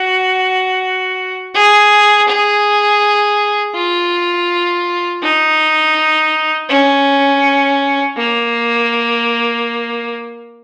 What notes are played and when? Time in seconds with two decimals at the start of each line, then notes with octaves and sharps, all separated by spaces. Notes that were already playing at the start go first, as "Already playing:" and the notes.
Already playing: F#4
1.54 G#4
2.28 G#4
3.74 F4
5.22 D#4
6.69 C#4
8.16 A#3